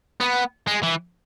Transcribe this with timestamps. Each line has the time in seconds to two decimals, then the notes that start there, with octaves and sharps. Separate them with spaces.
0.21 B3
0.67 G#3
0.83 E3